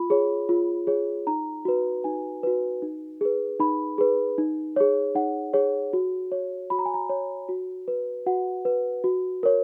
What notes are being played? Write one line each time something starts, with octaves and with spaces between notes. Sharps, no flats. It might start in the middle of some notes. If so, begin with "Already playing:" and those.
Already playing: F4 B5
G#4 C#5
F4
G#4 C#5
D#4 A#5
F#4 B4
D#4 G#5
F#4 B4
D#4
G#4 B4
D#4 B5
G#4 B4
D#4
G#4 C#5
D#4 F#5
G#4 C#5
F#4
C#5
F#4 B5
A#5
G#5
A#5
C#5
F#4
B4
F#4 F#5
B4
F#4
A#4 C#5